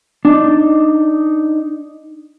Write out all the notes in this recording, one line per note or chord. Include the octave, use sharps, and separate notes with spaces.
D4 D#4